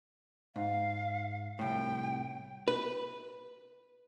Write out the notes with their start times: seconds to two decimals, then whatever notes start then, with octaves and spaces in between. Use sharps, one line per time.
0.56 G#2 F5
1.59 C2 A2 G5
2.68 B4